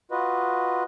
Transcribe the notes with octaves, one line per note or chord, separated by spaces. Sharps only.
F4 F#4 B4 D#5